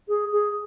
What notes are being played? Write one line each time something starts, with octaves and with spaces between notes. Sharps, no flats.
G#4
G#4